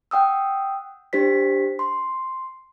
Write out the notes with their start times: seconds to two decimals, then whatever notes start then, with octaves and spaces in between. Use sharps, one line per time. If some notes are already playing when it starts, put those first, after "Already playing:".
0.11 F#5 G5 D#6 E6
1.13 D4 G4 C5 B6
1.79 C6